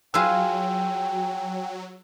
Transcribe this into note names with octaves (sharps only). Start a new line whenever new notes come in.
F#3 F4 G#4 B4 G5 G#5 E6